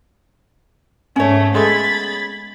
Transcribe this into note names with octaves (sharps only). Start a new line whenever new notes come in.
G#2 A3 C#4 C#5
G#3 A3 B3 B5 G#6 A6